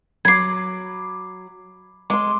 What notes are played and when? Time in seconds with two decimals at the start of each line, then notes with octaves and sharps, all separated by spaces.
0.25 F#3 B5 D6 G#6 C7
2.10 G#3 C6 D6